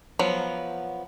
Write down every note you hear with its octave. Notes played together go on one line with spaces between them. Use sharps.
F3 F#3 B3